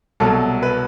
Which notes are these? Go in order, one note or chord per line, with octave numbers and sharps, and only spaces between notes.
C2 B2 F#3 A4
B4